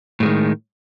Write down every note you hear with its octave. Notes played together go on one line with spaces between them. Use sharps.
A2 D#3 G#3